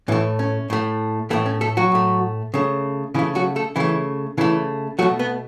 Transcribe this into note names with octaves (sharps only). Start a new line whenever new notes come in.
A2 E3 A3 E4
C#4
A2 A3
A2 E3 A3 E4
C#4
A3 A4
F#3 F#4
A2 A3
C#3 A3
C#3 E3 A3 E4
F#3 F#4
A3 A4
C#3 E3 A3 E4
C#3 E3 A3 E4
B2 F#3 A3 F#4
B3 B4